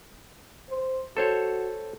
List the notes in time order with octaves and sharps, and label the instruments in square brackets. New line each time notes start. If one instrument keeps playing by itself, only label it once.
[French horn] C5
[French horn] F#4 [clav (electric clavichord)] A4 C5 C#5